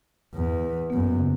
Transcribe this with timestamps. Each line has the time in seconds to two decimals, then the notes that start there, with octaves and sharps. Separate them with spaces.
0.35 E2
0.90 B3
0.93 F#2 A#3
1.17 C#3